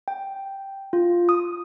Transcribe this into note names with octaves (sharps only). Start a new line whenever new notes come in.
G5
F4
D#6